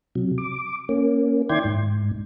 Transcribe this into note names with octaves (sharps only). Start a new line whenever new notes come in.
C3 F#3
D6
A#3 C#4
D#3 E4 D5 G5 C6 G#6
G#2